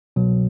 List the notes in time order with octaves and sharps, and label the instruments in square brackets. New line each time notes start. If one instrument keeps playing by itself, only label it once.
[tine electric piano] C2 B2 F#3